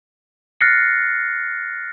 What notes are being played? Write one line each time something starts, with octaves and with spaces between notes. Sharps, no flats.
F6 F#6 A6 A#6 C7 C#7